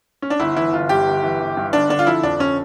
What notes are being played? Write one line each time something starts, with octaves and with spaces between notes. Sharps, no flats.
C#4
D4
G1 E4
E3 E4
G1 F4
G2 G4
G1
E3
G1
G2
G1 D4
D3 D4
F4
F3 E4
F2 D4
C#4